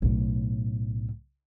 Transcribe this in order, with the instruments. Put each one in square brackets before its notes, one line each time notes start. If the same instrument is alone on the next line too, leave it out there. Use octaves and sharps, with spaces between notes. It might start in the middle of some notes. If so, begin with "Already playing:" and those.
[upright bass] B1 A2